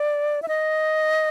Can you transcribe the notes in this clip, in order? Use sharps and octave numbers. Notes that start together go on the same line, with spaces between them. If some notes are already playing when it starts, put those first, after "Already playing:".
Already playing: D5
E5
D#5